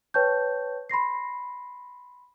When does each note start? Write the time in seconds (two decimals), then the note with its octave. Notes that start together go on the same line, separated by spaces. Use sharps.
0.14 B4 C#5 G5 A5 C#6 G6
0.90 B5 C6 A#6 C7